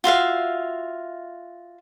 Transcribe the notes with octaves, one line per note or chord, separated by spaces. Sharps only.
F4 F#4 E5 F5